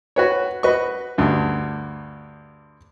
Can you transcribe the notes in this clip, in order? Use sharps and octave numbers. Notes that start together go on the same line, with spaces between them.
F#4 B4 C#5
F#4 B4 D#5 C#6
D2 G2